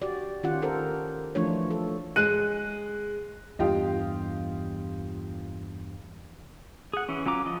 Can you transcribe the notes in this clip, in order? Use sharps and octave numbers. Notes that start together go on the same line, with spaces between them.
F#4 G4 D5
D#3 C#4 F4 G4 F#5
F4 A4 A#4 C5
E3 F3 A3 D4 F4 C#5
A4
G#3 F#6 D#7
E2 G2 F4 G4 D#5
G#4 F#5
E3 C#4
F#3 C#4 F4 A#5 D6
F3 D#5